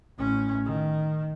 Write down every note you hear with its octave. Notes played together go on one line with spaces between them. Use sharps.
A1 C#4
D#3